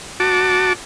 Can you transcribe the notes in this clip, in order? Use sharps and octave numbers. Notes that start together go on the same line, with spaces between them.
F#4 A5 D6